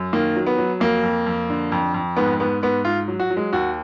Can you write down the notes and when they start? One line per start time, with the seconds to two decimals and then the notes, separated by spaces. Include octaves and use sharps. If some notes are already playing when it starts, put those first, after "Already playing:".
Already playing: F#2
0.13 D#3 A#3
0.36 F#3
0.46 B3
0.58 F#3
0.80 F2 A#3
1.03 F2
1.26 F2
1.50 D3
1.72 F2
1.94 F2
2.17 G#2 B3
2.40 G#2 B3
2.62 G#2 B3
2.85 G#2 F4
3.08 F#3
3.20 F#4
3.30 F#3
3.37 G#3
3.53 D#2 F#4